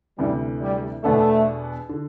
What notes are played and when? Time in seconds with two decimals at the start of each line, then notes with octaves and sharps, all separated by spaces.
0.17 D2 C3 E3 G3
0.60 G3
1.03 E2 B2 A3 B3 D4 A4
1.89 D3